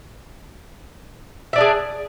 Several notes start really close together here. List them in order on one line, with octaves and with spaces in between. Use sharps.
E5 D5 D4 G#4